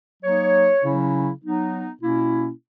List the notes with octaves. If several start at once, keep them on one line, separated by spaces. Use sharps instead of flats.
F#3 A#3 D#4 C#5
C#3 F#3 C#4 E4
F#3 B3 D#4
B2 A#3 C#4 E4